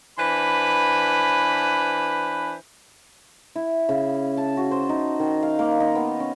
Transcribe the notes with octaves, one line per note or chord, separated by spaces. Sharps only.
E3 D4 B4 C5 B5
E4
C#3
A5
F#4
C5
D#4
D#3
F5
A#3
D#4
B3
C#4